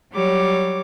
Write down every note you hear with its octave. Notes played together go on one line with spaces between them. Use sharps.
F#3 G3 C#5 D6